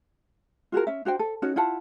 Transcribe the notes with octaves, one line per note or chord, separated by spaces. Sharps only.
F4 F#4 G#4 A#4
C#4 E5
D4 F#4 C5 G5
A4
C#4 D#4 F#4
E4 F4 F#5 A5